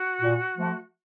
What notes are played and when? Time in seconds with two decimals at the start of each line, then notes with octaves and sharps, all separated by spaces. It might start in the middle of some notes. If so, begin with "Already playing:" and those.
Already playing: F#4
0.22 A#2
0.57 F3 A3